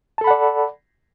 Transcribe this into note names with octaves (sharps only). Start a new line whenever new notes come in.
A4 D5 F#5 A5 B5